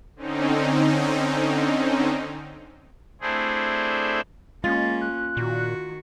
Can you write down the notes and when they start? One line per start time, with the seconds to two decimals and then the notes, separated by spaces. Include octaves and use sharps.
0.16 D3 C4 C#4 D#4
3.21 A3 C4 D4 E4 G#4 C5
4.64 G#3 A#3 C#4 F4 A6
5.01 F#6
5.37 A#2 D#3 F#4